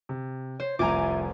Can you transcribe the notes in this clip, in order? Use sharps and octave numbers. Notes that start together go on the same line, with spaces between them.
C3
C5 C#5
F1 C2 F3 E5 G#5 A#5 D6